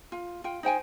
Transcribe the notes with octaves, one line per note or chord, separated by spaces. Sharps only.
F4
F4 G5
D#4 C5 G5 G#5